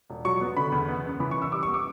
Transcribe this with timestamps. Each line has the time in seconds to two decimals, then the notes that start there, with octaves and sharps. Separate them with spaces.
0.10 E1
0.25 F#3 C#6
0.41 B3
0.56 D3 B5
0.72 E2
0.88 B3
1.05 F#2
1.20 E3 B5
1.31 C#6
1.37 F#2
1.42 E6
1.52 G3 D6
1.63 C#6
1.68 B3
1.74 D6